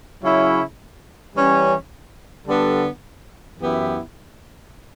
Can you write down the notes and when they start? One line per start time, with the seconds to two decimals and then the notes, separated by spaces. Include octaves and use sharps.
0.22 C#3 F#3 C#4 E4
1.35 E3 G3 C#4
2.47 D3 G3 B3 D4 A4
3.60 F#2 E3 B3 E4 G4